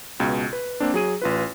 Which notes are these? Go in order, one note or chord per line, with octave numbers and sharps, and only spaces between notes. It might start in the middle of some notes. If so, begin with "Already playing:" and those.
C#2 B2
B4
A#3 C4 D4
F#3 G#4 D#7
A1 F4 B4